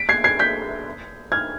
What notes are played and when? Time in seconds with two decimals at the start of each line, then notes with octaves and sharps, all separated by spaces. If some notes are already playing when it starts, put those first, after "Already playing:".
Already playing: B6 D7
0.09 G#6 C7
0.24 G#6 C7
0.39 G6 B6
1.32 F6 G#6